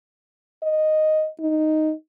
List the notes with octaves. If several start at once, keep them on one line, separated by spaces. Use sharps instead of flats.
D#5
D#4